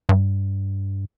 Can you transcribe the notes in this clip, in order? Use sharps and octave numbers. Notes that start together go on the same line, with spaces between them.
G2